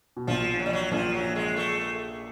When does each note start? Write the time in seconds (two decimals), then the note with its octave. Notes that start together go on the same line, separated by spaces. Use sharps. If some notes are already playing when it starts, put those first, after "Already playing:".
0.17 B2
0.27 A#1 A#2 F3
0.59 F#3
0.66 G3
0.73 F#3
0.91 A#1 A#2 F3
1.14 F#3
1.35 G#3
1.56 A3